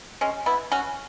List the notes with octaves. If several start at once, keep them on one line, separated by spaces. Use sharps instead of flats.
G#3 C#4
B3 E4
C#4 F#4